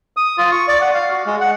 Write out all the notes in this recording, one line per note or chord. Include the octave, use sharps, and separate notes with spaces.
D#6
F4
C#6
D5
F#5
F5
F#4
G#3
F#5